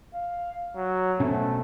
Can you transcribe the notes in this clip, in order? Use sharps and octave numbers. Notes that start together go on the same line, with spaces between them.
F5
F#3
B2 A3 C#4